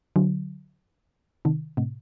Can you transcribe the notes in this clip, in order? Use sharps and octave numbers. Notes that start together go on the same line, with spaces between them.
D3 F#3
C3 D#3
A2 C3